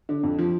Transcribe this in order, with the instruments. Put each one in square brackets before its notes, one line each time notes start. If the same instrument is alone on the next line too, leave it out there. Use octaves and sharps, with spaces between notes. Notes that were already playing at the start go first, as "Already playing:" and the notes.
[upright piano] D3
F2
F3